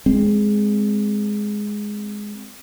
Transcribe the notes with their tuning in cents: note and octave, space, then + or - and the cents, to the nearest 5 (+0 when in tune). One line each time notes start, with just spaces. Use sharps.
G#3 +0 C4 +0